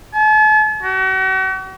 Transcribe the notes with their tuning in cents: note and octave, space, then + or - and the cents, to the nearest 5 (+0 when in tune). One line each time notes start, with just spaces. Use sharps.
A5 -40
F#4 +40